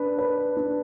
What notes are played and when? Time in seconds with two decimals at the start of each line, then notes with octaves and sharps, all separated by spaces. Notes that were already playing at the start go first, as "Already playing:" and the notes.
Already playing: D4 B4
0.18 B4
0.57 D4